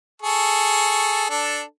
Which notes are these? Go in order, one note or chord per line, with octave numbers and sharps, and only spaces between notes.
G#4 A4 C#6
D4 A4